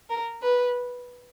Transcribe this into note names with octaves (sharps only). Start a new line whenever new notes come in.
A#4
B4